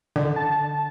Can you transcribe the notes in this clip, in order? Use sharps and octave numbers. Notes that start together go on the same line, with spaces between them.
D3
A5